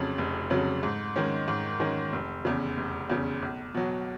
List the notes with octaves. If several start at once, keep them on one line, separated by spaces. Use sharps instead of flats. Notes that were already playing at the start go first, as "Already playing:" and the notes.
Already playing: F1 F2 C#3 F#3
F1
F2 C#3 F#3
G#2
D#3 G#3 C#4
G#2
D#3 G#3 C#4
F1
E2 C#3
F1
E2 C#3
B1
B2 F#3